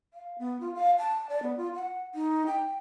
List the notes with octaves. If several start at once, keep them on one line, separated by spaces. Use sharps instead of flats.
F5
B3
F4
F5
A5
D5
B3
F4
F#5
D#4
G5